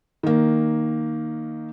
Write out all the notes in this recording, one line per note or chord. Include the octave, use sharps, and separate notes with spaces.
D#3 A#3